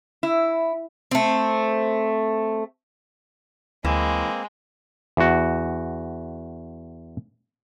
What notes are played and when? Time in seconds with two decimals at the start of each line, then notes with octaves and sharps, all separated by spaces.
0.23 E4
1.11 A3 C4
3.85 D2 E3 G#3 A#3 C4
5.17 E2 F#4